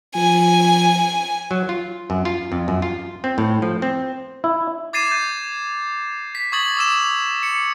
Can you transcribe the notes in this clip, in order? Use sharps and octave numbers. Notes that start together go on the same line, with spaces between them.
F3 G#5
F#3
F4
F#2
F4
F2
F#2
F4
C4
A2
F3
C4
E4
D6 G#6 A6 C7 D#7 E7
G6
B6
C#6 D#6 G#6 A6 F#7
D6 E6 E7
C#7